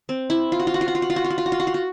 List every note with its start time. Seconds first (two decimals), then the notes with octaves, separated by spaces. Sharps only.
0.09 C4
0.30 E4
0.52 F4
0.59 F#4
0.67 F4
0.74 F#4
0.81 F4
0.88 F#4
0.95 F4
1.02 F#4
1.10 F4
1.16 F#4
1.24 F4
1.30 F#4
1.38 F4
1.46 F#4
1.52 F4
1.60 F#4
1.67 F4
1.74 F#4